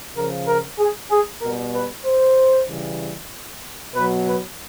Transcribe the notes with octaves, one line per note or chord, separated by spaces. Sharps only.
C#3 F3 A#4
A#4
G#4
G#4
B2 G3 A#4
B4
C5
C#3 E3 G3
B2 F#3 B4
B4